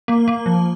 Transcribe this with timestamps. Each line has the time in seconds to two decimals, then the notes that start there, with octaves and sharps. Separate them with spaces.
0.08 A#3
0.28 A#3
0.46 F3